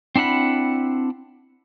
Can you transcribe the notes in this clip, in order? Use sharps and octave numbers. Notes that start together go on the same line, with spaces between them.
C4 D4 E4 F#5 B5